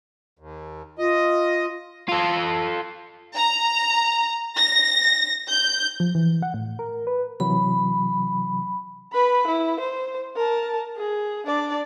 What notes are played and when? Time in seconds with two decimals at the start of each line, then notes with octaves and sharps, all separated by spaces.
0.39 D#2
0.98 F4 D#5
2.08 F4 A4
3.36 A#5
4.57 A#6
5.48 G6
6.00 F3
6.15 E3
6.42 F#5
6.54 A2
6.79 A#4
7.07 B4
7.40 C3 E3 F#3 B5
9.13 B4 B5
9.47 E4
9.80 C5
10.36 A#4 A5
10.96 G#4
11.46 D4 D5